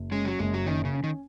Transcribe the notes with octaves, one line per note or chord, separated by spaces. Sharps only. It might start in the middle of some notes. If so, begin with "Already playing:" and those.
Already playing: F#1
G#3 C#4
F#3
F#1 G#3
F#3
D#3 C#4
C#3
C#4
D#3